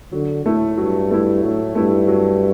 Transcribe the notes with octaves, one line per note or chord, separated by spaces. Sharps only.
D3 F#3
A2 A3 E4
G2 F#3
A3 E4
A2 F#3
G2 A3 E4
F#3